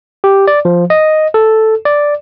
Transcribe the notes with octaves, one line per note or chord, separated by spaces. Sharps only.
G4
D5
F3
D#5
A4
D5